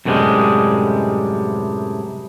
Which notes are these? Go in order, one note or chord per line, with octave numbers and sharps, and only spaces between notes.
F#2 A2 C3 E3 G3 G#3